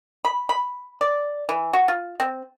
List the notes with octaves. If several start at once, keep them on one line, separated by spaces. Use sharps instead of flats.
B5
B5
D5
E3
F#4
F4
C4